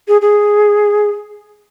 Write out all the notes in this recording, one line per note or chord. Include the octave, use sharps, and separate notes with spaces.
G#4
G#4